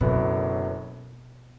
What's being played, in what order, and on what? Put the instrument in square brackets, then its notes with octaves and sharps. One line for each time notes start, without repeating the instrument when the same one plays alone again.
[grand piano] F#1 F#2 D3 F#3 B3 [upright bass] B2